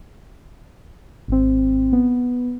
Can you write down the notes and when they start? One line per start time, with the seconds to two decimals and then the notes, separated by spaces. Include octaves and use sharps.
1.28 G#1 C4
1.93 B3